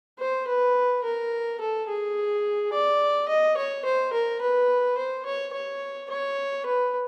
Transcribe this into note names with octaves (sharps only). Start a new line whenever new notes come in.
C5
B4
A#4
A4
G#4
D5
D#5
C#5
C5
A#4
B4
C5
C#5
C#5
C#5
B4